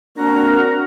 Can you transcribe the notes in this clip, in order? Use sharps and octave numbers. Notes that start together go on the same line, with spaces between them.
A#3 C4 D4 F#4 A#4 A#5